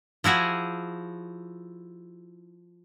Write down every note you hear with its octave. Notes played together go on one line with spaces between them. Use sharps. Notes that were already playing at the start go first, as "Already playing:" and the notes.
F3 E4 F#4 G#4